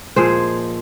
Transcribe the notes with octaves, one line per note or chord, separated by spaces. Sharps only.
A#2 F3 G#3 G#4 C5